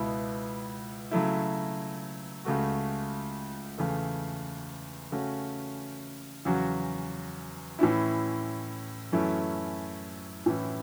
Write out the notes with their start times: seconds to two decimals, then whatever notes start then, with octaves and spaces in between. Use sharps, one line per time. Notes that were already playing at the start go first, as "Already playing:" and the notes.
Already playing: C#2 B2 B3 E4
1.11 C#3 F#3 A3 E4
2.45 C#2 C#3 A3 F#4
3.78 E2 C#3 A3
5.12 C#3 A3 C#4 F#4
6.45 E2 C#3 F#3 C#4 F#4
7.79 A2 E3 C#4 E4
9.12 F#2 E3 A3 C#4 E4
10.46 A2 E3 C#4 E4